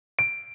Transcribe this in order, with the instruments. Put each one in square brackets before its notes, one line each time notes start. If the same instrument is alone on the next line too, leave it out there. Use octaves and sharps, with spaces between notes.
[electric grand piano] D7